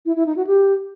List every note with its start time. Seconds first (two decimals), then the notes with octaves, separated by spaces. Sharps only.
0.06 E4
0.16 E4
0.26 D#4
0.36 F#4
0.47 G4